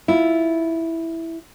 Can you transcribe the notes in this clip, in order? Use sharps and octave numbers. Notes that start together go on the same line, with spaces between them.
E4 F4